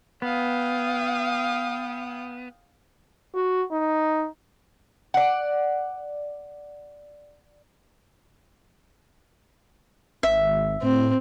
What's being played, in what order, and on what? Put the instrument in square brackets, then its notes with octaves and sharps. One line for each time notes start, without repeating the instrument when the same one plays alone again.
[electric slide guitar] B3 [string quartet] F5 G5 D#6
[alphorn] F#4
D#4
[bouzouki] D5 F#5
[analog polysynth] G#1 [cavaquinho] E5
[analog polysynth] A2 [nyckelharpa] C4